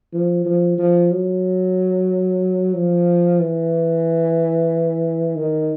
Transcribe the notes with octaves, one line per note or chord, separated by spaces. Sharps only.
F3
F3
F3
F#3
F3
E3
D#3